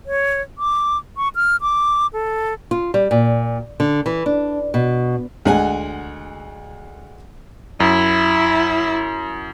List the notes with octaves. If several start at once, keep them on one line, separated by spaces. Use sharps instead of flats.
C#5
D6
C#6
F6
D6
A4
F4
G3
A#2
D3
E3
D4
B2
D2 G#3 F#5 G#5
F#2 E4